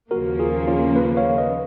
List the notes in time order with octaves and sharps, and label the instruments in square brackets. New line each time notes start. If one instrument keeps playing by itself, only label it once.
[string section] D#2 C#3 F3 A#3 [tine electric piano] F#4 A#4
[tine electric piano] F4 G#4
C#4 F4
G#4 B4
C#5 F5
B4 D#5